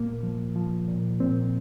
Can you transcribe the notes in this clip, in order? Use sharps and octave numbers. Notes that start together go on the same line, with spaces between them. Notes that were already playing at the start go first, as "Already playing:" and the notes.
Already playing: A#2 A#3
F3
F3
A#2
A#2 C4